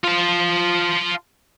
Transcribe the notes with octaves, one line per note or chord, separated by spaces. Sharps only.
F4 A5